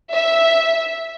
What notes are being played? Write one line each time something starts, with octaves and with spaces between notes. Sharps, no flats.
E5